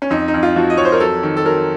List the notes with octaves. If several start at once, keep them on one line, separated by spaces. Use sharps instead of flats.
C#4
F2 D#4
D#4
F2
F4
F3 F#4
D#5
F2 C#5
C5
A#4
F#3 A4
D#3
A4
F#3 A#4